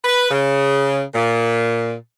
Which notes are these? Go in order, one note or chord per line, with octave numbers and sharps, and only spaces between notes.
B4
C#3
A#2